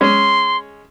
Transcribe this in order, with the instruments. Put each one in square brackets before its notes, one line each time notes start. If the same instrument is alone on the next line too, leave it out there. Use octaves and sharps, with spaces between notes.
[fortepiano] G#3 C#4 [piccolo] C6